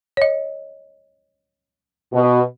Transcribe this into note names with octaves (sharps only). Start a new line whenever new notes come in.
C#5 D#5
B2